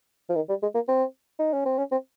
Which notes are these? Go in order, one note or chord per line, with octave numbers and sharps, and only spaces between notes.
F3
D#3
G3
G#3
A#3
C4
D#4
C#4
C4
C#4
C4